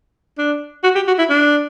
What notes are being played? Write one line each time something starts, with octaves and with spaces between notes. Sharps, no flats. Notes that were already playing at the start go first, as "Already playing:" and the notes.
D4
F#4
G4
F#4
E4
D4